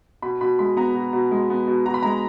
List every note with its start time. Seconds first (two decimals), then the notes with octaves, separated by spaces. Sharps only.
0.22 B2 B5
0.41 B2 B5
0.59 G#3 B5
0.77 B3 A#5
0.95 B2
1.13 B2
1.31 G#3
1.50 B3
1.68 B2
1.86 B2 A#5
1.94 B5
2.03 G#3 A#5